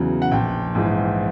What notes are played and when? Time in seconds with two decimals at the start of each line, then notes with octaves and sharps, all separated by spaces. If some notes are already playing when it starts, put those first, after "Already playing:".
Already playing: E2 C#3 F#3
0.22 F#5
0.31 A#1 G5
0.75 G#2 E3